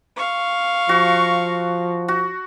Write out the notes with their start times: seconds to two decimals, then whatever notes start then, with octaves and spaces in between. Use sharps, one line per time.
0.16 F5 C#6
0.89 F3 F#4
2.08 F#4